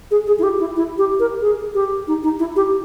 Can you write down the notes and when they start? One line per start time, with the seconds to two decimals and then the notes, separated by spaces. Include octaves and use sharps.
0.11 G#4
0.27 G#4
0.39 E4
0.43 G4
0.60 E4
0.76 E4
0.98 G4
1.20 A#4
1.41 G#4
1.75 G4
2.08 D#4
2.23 D#4
2.39 E4
2.56 G4